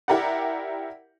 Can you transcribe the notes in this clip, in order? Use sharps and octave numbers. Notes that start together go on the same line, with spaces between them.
E4 G4 A#4 D5 F#5